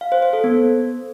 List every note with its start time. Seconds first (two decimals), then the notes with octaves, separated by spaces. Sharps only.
0.01 F5
0.12 C5
0.22 C5
0.33 A4
0.44 B3